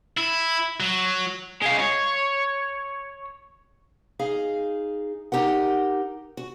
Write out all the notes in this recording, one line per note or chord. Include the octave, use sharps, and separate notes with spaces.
E4
F#3
G#3 F5
C#5
D#4 G#4 F5
D#4 G4 A#4 F#5
F#4